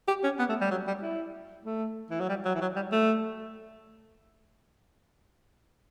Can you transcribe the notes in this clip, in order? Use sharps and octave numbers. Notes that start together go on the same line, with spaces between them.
G4
C#4
B3
A3
G3
F#3
G3
E4
A3
E3
F#3
G3
F#3
E3
F#3
G3
A3